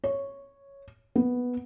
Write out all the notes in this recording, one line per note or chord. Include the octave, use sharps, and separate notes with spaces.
C#5
B3